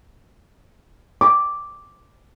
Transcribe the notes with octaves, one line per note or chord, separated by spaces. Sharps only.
D6